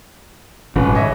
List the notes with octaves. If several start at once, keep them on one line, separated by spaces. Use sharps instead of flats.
D#1 G#1 C#3 B4
C#5 D#5 E5